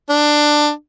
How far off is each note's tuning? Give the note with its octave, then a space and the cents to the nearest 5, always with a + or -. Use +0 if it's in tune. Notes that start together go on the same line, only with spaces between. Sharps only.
D4 +15